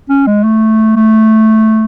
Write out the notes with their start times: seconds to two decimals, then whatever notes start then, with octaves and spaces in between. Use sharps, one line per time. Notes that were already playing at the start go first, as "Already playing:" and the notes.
0.09 C#4
0.27 G#3
0.44 A3
0.97 A3